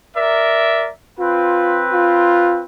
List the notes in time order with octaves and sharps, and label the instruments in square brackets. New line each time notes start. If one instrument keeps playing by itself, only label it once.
[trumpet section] A#4 D5 E5
[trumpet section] C4 B4 [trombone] F4
[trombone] F4